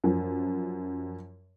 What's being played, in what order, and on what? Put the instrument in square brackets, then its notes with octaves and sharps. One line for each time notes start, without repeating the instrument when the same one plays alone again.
[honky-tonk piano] F#2 F3